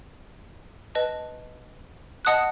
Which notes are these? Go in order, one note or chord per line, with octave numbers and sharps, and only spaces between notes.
B4 D#5 A5
D#5 F#5 A5 D#6 F#6